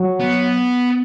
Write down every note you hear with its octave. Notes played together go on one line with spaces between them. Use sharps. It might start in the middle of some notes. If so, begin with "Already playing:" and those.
Already playing: F#3
B3